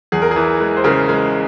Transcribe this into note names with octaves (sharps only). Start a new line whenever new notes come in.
E2 G#4
A#4
G#4
E3
G#3
C5
C#3 A#4
G#3